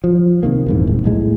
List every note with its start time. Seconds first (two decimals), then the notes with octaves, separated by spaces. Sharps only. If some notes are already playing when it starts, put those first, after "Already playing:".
0.04 F3
0.43 C3 D#3 A#3
0.66 D#1 E2 G#2
0.87 D#1
1.04 B1 A2 G#3